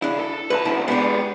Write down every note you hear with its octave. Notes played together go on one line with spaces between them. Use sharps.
C#3 D4 E4
A4
C2 B4 A5
F#2 D3 E4
G#3 B3 D4 G4